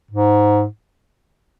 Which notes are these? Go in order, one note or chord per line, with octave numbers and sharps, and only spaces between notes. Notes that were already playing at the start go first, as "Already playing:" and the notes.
G#2